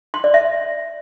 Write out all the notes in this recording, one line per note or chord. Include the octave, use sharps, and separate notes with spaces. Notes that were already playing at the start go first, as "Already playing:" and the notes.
C6
D5
E5